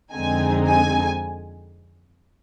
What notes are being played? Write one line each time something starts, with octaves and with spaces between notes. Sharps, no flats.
F2 D3 G#3 C4 D#4 G#5
G#5